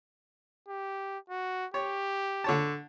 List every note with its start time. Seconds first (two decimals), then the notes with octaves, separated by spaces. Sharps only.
0.68 G4
1.30 F#4
1.74 G4 C#5
2.44 D3 C#5 A5